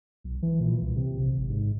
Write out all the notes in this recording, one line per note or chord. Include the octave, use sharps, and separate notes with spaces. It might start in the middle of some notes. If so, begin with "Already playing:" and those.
B1
E3
A#2
C2
C3
A#1
G#1
G#2